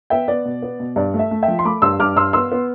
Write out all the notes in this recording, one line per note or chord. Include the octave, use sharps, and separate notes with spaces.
B3 E5 G5
B3 D5
B2
B3
B2
G2 D5
A3
E5
A3
E5 G5
F3
C6
A3 B5 D6
G2 C6 E6
G2 D6 F6
G2 C6 E6
B3 C6 E6
B3